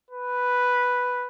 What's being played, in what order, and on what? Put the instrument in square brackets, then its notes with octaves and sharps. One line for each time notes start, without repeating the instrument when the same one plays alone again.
[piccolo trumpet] B4